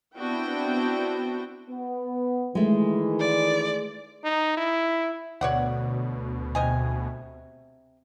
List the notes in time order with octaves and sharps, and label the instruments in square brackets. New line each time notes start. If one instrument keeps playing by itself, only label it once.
[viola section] B3 C4 D4 E4 F#4 G5
[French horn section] B3
[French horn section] D#3 E3 [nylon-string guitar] G#3 A3
[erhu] D5
[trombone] D#4
E4
[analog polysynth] D2 B2 [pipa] C#5 D5 F#5
[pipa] C3 D#5 G#5